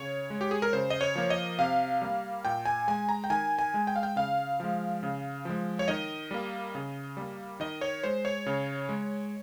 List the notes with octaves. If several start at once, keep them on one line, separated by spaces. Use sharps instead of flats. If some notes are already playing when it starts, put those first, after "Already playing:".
Already playing: C#3 C#5
G#3
G4
G#4
A#4
C#3 C5
D#5
C#5
F3 A#3
D#5
C3 F5
G3 A#3
A#2 G5
G#5
G#3 G#5
A#5
G5
D#3 G#5
G#5
G#3
G5
F5
G5
C#3 F5
F3 G#3
C#3
F3 G#3
C#5
D#3 D#5
G3 A#3
C#3
G3 A#3
D#3 D#5
C#5
G#3 C5
C#5
C#3
G#3